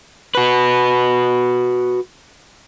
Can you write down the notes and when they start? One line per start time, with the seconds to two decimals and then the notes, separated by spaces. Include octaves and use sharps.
0.35 F#4 B4